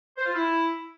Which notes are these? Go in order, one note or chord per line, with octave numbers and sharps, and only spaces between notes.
C5
F4
E4